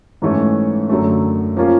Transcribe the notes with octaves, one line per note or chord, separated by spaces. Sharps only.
G#2 E3 A3 C#4
F#2 D3 F#3 A3
F3 A#3 C#4 F4